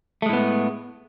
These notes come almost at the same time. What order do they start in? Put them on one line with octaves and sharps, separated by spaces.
A3 G#3 A2 B3